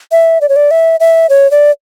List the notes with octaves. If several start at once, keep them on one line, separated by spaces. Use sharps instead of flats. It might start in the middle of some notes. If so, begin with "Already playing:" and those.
E5
D5
C#5
D5
E5
E5
C#5
D5